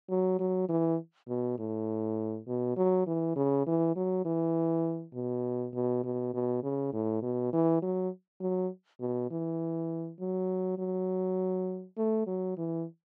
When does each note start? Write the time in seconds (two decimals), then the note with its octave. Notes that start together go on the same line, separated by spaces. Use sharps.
0.10 F#3
0.40 F#3
0.69 E3
1.29 B2
1.58 A2
2.47 B2
2.77 F#3
3.07 E3
3.36 C#3
3.67 E3
3.96 F#3
4.25 E3
5.14 B2
5.74 B2
6.04 B2
6.34 B2
6.63 C#3
6.93 A2
7.22 B2
7.53 E3
7.82 F#3
8.41 F#3
9.01 B2
9.31 E3
10.20 F#3
10.78 F#3
11.97 A3
12.27 F#3
12.58 E3